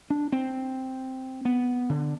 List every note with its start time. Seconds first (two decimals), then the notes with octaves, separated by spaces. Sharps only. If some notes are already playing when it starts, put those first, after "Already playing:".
0.10 D4
0.32 C4
1.45 B3
1.89 D3